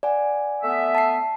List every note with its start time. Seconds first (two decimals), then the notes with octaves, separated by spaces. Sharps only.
0.03 D5 F#5 G#5
0.62 A3 B3 E5
0.95 A5 C7